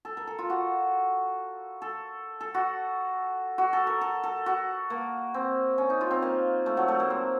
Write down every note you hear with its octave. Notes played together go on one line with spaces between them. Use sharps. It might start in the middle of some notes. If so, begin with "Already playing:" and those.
A4
A#4
A4
F4
F#4
A4
A4
F#4
F#4
A4
A#4
A4
A4
F#4
A#3
C4
C#4
D#4
F4
C4
A#3
A3
F#3
A3
A#3
C4